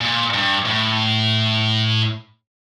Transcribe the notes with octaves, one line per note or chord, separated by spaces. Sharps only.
A#2
G2
A2